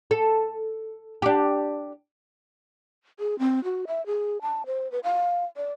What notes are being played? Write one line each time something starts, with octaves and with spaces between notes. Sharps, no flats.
A4
D4 G4
G#4
C4
F#4
E5
G#4
A5
C5
B4
F5
D5